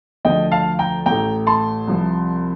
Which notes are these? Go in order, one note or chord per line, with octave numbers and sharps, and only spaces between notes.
D2 D3 F3 D#5 G5
F5 A5
G5 A#5
A1 A2 A3 G5 A#5
A5 C6
C2 C3 F3